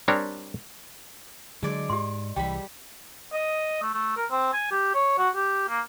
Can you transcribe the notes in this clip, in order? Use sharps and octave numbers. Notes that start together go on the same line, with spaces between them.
G3 C4 D4 A#4 C#5
D3 F#3 G#3 D5
G#2 G4 C6
C2 E3 G3 G5 B5
D#5
A3
A3
A#4
C4
G#5
G4
C#5
F#4
G4
A#3